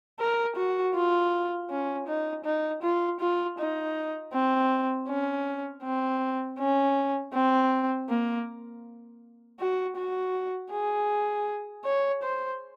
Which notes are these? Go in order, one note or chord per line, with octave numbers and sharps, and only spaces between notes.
A#4
F#4
F4
C#4
D#4
D#4
F4
F4
D#4
C4
C#4
C4
C#4
C4
A#3
F#4
F#4
G#4
C#5
C5